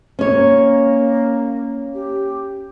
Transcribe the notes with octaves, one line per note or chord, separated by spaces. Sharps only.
A#3 C#4 C#5
G4